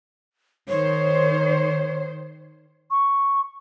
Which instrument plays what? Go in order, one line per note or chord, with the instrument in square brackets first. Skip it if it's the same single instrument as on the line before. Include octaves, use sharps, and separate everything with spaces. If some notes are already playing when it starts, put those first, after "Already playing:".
[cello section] D#3 C5 [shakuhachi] C#5
[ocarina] C#6